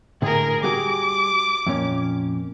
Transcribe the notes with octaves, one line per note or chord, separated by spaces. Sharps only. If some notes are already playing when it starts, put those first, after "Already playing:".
A2 D3 G#4 A#4
G3 F#4 G#4 D6
F2 A#2 C#4